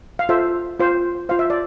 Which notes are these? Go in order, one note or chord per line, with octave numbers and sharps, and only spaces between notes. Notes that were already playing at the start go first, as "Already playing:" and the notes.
F5
F4 A4 C5 E5
F4 C5
F4 C5 F5
E5
D5